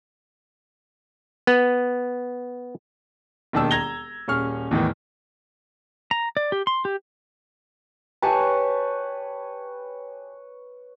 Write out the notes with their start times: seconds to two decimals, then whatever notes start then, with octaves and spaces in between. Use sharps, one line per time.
1.47 B3
3.53 E1 D#2 D#3 D4 A5 E6
3.71 A#5 G#6 A#6 F7 G7
4.28 D#1 C#4 G#4 C#6 F6
4.71 E2 A2 D#3 E3
6.11 A#5
6.37 D5
6.52 G4
6.67 C6
6.85 G4
8.22 G4 B4 C#5 G#5 A5